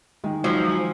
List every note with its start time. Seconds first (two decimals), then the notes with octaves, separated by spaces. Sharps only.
0.24 D#3 G#3
0.44 F3 F#3
0.71 G#5